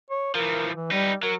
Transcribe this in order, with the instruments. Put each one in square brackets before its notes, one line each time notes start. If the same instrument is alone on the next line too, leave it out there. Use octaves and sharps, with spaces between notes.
[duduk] C#5
[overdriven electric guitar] E3 F3 [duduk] A#4
[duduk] E3
[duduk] G3 [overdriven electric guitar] D#4 B4
[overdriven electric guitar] F#3 [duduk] A#4